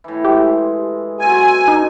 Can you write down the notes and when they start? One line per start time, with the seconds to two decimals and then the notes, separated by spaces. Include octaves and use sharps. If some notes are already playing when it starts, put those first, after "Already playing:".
0.04 A2 E3
0.25 G#3 G4
1.20 B2 F#3 C4 G#5
1.68 D#4